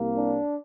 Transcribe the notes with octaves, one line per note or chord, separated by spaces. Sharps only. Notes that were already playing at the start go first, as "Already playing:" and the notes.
Already playing: C2 C3 A#3
D4